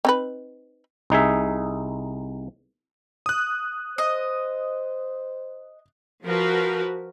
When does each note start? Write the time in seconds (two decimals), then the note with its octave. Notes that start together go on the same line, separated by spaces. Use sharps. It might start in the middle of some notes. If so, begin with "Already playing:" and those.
0.05 C4 D#4 B4
1.10 C2 D#4 G#4 E5
3.26 D#6 F#6
3.98 C5 D#5
6.25 F3 F#4 A#4 B4